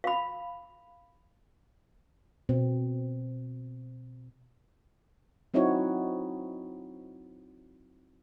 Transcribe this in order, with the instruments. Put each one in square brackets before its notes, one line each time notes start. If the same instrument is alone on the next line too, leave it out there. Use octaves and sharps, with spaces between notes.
[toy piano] F5 B5
[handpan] B2 C4
F#3 C4 D#4 E4 F#4 C#5